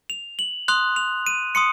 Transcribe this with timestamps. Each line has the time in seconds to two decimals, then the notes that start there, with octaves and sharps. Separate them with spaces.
0.10 F7
0.39 F#7
0.68 C6 D#6 F#6 F7
0.96 F7
1.26 D#7
1.55 C6 D#6 C#7